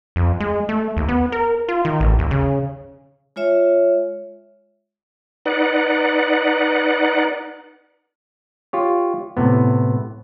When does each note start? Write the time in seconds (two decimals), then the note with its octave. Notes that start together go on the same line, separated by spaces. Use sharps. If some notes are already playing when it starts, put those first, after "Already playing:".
0.16 F2
0.40 G#3
0.69 A3
0.97 D#2
1.09 B3
1.32 A#4
1.69 F4
1.85 D#3
2.00 A1
2.19 D#2
2.31 C#3
3.36 G#3 F4 C#5 E5
5.46 D#4 B4 D5 F#5
8.73 F4 G4 C#5
9.37 A2 C3 B3